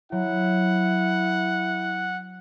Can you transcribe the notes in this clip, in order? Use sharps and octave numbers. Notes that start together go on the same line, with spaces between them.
F#3 E4 F#5